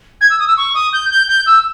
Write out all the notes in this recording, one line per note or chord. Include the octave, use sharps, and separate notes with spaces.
G#6
E6
D#6
E6
C#6
D#6
G6
G6
G6
E6